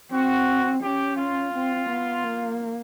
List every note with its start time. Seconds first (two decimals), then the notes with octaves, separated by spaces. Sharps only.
0.11 C4 F#4
0.82 C#4 G4
1.17 F4
1.52 C4
1.89 B3
2.23 A#3